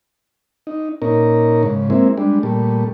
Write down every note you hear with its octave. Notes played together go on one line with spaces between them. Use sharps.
D#4
A#2 C#4 D#4 A#4
G#2 C#3
G#3 A#3 C4 E4
G3 G#3 D4
A#2 G3 A3